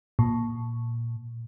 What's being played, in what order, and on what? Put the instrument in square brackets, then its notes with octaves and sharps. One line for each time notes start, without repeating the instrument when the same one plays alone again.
[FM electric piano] A#2